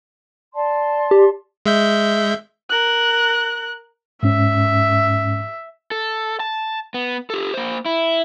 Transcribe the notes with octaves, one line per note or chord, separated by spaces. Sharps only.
D5 A5 C6
G4
G#3 E5 G6
A#4 F#6
G#2 C#4 E5
A4
A5
B3
G4 A4
A#3 C5
E4